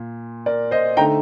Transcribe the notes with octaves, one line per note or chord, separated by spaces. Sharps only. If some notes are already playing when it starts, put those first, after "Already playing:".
Already playing: A#2
A#4 D5
C5 D#5
D3 A3 D#4 G5 A#5